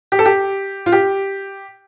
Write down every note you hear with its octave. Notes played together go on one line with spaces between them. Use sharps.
G4
A4
G4
F4
G4